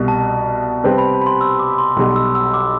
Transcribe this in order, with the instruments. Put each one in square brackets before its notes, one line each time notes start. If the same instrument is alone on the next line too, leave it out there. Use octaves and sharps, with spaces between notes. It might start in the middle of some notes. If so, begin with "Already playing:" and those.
Already playing: [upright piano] C2 B2 G3
[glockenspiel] A5
[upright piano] C3 G3 C4 G4 B4
[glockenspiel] B5
B5
C6
E6
D6
C6
[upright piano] B1 B2 G3 [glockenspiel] C6
[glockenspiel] E6
E6
D6